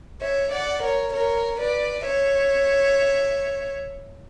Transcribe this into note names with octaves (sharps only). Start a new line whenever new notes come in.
C#5 E5
D5 F#5
A#4 C#5
A#4 C#5
B4 D5
C#5 E5